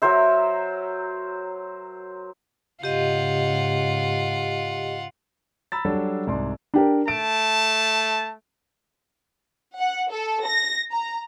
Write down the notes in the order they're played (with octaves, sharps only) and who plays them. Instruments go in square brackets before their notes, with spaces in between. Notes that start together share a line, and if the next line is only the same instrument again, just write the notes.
[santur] F#3 A#4 C5 E5
[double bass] G#2 C#3 [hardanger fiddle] F4 F#5 [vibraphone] G4 D#5
[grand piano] A#5 B5 E6 A6
F#3 G3 D4 A4
C2 G#2 D5 C6
[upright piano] D4 G4 A#4
[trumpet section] A3 A5 [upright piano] D7
[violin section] F#5
A4
A#6
A#5